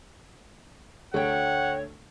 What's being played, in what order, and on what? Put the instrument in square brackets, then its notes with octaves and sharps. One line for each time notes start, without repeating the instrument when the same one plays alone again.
[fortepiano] D2 A3 [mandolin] F#4 G5 [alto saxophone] C#5 [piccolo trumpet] F#5